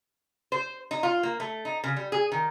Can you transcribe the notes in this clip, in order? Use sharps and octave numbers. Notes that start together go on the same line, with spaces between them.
C5
D#4
F4
A#3
A3
D#4
C#3
G3
G#4
D#3